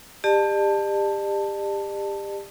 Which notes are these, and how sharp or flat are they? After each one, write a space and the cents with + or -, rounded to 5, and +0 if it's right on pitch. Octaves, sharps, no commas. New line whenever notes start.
G4 +30 D5 +45 A5 +10